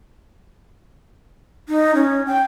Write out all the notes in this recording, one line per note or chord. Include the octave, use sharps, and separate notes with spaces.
D#4
C#4
G5